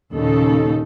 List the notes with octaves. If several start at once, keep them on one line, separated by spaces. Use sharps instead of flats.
D#2 A#2 C#3 D#4 A4